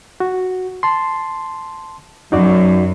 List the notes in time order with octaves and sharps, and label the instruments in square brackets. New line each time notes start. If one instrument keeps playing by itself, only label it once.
[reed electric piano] F#4
A5 C6
[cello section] F#2 [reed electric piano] D#4 F#4 D5